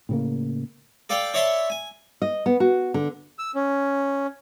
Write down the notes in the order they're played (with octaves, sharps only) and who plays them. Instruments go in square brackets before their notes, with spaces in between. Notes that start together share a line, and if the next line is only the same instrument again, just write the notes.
[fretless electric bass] A2 C#3 A#3
[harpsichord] A4 D5 F5 G5
C#5 D5 E5 A5 C6
G#5
[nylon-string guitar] D#5
B3
F#4
D3
[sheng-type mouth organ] E6
C#4